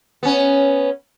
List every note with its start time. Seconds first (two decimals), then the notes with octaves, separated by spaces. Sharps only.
0.23 B3 C#4